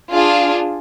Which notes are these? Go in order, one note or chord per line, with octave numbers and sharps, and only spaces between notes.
D4 F4 G#4